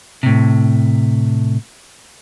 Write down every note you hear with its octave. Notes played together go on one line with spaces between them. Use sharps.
A2 C3